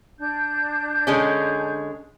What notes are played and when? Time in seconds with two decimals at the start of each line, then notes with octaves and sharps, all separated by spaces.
0.18 D4 G6
1.07 D3 G#3 C#4